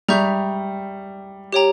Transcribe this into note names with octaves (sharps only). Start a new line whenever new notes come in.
G3 G#4 E5 A#5 C#6 G6
G4 C#5 G5 A#5